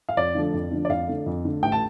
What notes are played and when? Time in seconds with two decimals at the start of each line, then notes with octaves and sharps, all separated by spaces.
0.09 F5
0.17 F2 D5
0.35 D3 F3 A3 D4
0.54 F2
0.72 D3 F3 A3 D4
0.85 D5
0.89 F2 F5
1.07 D3 A3
1.26 F2
1.45 D3 A3
1.62 A1 G5
1.72 A5